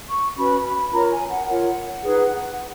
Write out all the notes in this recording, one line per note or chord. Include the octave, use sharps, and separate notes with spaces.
C#6
C#4 F#4 B4 B5
B5
F4 A#4 C#5 A#5
G#5
F#5
F4 A#4 C#5 F#5
D#4 G#4 B4